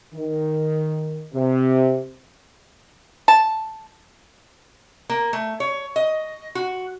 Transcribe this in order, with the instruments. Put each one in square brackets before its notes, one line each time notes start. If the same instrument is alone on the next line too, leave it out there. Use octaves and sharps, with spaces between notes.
[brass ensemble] D#3
C3
[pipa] A5
[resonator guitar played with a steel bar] A#3
A3
C#5
D#5
F#4